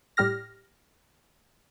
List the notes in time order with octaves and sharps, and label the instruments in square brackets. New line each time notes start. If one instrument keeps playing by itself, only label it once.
[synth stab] A2 G3 G4 F6 A#6